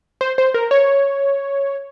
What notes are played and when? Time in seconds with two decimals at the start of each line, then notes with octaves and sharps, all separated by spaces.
0.21 C5
0.38 C5
0.54 A#4
0.71 C#5